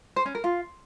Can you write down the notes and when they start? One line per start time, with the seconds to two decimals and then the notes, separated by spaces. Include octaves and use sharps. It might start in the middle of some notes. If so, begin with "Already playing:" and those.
0.16 C5
0.26 C#4
0.35 A#4
0.44 F4